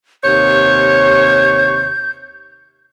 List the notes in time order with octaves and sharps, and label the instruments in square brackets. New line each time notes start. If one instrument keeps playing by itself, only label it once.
[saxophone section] D#2 C3 C#5 [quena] G6